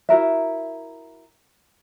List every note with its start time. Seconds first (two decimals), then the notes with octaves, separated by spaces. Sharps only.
0.09 E4 F#4 A#4 E5